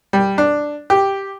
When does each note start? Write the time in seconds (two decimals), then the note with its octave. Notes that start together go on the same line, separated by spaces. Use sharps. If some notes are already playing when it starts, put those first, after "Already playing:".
0.13 G3
0.38 D4
0.90 G4